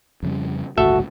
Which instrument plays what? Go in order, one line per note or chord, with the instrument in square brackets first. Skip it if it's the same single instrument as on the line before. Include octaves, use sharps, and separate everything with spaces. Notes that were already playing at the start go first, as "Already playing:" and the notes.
[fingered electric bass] F2 C#3 G3
[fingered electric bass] G1 C#2 A2 [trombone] F#4 [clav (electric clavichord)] A4 E5